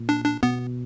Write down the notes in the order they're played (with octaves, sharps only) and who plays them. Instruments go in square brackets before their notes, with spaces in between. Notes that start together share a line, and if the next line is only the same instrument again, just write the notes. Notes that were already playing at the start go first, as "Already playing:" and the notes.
Already playing: [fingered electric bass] A#2
[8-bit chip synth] D4
D4
[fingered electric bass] B2 [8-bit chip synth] B3